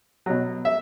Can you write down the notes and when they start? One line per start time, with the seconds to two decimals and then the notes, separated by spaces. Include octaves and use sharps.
0.26 B2 F#3
0.65 E5